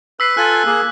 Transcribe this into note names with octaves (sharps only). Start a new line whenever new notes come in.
B4 E6 B6 C7
F4 A4 G#5 F#6
A#3 G#4